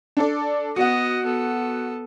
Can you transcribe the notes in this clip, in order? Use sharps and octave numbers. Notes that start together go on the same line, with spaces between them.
D4 A4 D5
B3 F#4 D#5 F#5
B3 A4